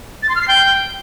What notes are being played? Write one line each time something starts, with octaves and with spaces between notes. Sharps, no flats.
A6
C6
F6
C7
G5